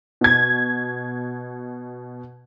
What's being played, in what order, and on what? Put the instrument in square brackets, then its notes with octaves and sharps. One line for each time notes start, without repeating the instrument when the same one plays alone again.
[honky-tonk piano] B2 G#6